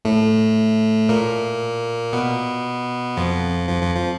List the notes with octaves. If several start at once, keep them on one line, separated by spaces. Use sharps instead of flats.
A2 A3
A#2 A#3
B2 B3
F2 F3
F2 F3
F2 F3
F3